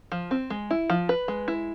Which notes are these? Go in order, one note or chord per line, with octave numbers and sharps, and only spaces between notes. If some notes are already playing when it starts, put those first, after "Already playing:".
F3
C4
G#3
E4
F3
B4
G#3
E4